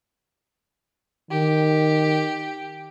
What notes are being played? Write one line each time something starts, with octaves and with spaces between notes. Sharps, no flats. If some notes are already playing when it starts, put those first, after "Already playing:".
D#3 G4